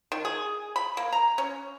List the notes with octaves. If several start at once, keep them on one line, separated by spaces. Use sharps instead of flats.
D#3
G#4
B5
A#3
A#5
C#4